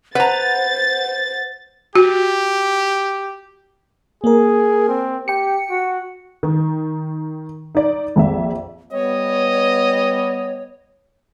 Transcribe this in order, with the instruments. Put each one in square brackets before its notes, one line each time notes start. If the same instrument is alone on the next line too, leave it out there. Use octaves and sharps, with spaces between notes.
[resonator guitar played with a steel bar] B4 A#5 [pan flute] C5 [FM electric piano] F#5 [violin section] A6
[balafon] F#4 [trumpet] G4
[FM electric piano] A#3 A#4 [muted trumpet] G#4
[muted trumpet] C4
[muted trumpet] G4 [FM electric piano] G5 C#7
[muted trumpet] F#4
[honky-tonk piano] D#3
D#4 D5
A#1 F2 E5
[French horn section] G3 B3 [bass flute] C#5 [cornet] D#5